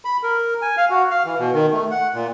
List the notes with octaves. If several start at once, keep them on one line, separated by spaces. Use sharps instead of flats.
B5
A#4
G#5
F5
F#4
F5
E3
B2
D#3
A3
F#5
A#2